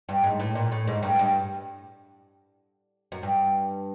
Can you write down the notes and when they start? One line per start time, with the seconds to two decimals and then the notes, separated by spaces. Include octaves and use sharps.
0.09 G2
0.24 G#2
0.40 A2
0.55 A#2
0.72 A2
0.87 G#2
1.03 G2
1.19 G2
3.12 F#2
3.23 G2